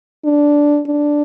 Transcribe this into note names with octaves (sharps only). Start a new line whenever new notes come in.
D4
D4